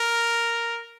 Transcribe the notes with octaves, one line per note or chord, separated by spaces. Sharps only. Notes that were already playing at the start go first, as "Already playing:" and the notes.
Already playing: A#4